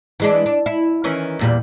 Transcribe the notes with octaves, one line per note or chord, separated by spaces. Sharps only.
E3 G#3 D4
D4
E4
D#3 E3 C#4
E2 A#2 G3